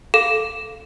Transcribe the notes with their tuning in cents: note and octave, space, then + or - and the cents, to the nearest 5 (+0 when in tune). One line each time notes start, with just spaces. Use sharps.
A4 -10 F5 -5